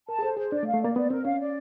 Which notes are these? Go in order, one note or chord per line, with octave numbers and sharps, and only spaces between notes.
A#4 A5
G#4
A4 C5
G#4 C5
D4 D5
A3
F5
A3
A#3 D5
B3 D5
C4 A#4
C#4 F5
D5